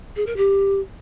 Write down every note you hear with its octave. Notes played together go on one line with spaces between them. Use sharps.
G#4
A#4
G4